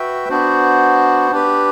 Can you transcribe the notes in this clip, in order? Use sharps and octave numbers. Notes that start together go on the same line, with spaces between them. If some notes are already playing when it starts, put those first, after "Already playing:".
Already playing: F#4 B4 E5 G5
B3 D4 F#4 C5
D4 G4 B4